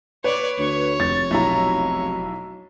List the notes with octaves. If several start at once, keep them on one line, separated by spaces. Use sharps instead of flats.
B4 C#5 D5
D2 C#5
F1 A6
B1 E4 A#5